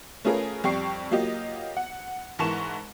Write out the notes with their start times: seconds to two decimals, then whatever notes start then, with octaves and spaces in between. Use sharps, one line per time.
0.25 A3 C#4 F4 G#4 A#4 B4
0.64 F2 G3 G5 C#6 C7
1.11 F#3 A#3 F4 G4 D#5
1.77 F#5
2.39 G#2 E3 A#4 A5 C#6 E7